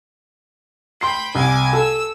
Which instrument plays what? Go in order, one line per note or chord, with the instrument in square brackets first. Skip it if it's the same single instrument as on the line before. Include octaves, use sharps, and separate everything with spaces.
[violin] G5 B5 [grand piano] C6 C7
[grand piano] C2 [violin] G#5 D6
[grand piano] A4 [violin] E6